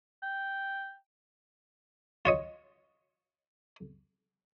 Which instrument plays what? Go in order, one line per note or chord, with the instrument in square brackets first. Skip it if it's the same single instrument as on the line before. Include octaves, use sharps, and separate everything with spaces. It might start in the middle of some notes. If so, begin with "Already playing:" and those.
[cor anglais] G5
[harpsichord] F4 C#5 D#5